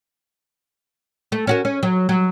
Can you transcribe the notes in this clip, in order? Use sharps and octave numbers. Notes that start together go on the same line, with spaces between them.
A3
C#4 F#4 A#4
C#4
F#3
F#3